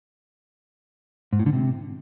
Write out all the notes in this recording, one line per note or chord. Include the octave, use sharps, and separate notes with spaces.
G#2
A2
D3
C3